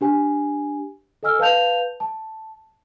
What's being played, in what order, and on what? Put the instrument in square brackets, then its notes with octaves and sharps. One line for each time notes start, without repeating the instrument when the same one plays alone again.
[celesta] D4 G4 G#5
A4 D#5 G#5 E6 F6
B4 F5 A5 G6 F7
A5